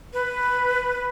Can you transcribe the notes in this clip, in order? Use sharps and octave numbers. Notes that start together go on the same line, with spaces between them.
B4